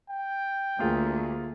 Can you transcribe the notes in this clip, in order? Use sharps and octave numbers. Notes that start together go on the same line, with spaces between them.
G5
D2 A#3 F4 G#4